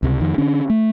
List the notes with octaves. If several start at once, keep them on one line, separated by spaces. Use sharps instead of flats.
C#2 C3
F2 D#3
D3 C#4 D4
A3